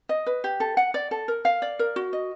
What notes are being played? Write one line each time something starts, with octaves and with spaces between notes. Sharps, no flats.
D#5
B4
G4
A4
F#5
D5
A4
A#4
F5
D5
A#4
F#4
D#5